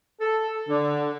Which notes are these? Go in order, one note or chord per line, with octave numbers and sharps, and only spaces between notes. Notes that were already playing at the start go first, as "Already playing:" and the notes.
A4
D3